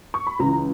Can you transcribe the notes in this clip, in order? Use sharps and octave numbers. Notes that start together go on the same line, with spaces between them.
C#6
B5
C#2 C#3 E3 A#5